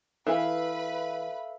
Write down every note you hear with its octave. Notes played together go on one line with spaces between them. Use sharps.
E3 A4 B4 E5 F5 B5